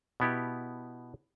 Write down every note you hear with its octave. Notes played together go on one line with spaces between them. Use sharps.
B2 B3 E4 G4